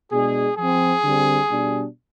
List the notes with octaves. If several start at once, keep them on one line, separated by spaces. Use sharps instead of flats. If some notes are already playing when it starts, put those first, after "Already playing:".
B2 G#3 D4 G#4
F3 C4 G#4
D3 G3 C4
B2 G3 D4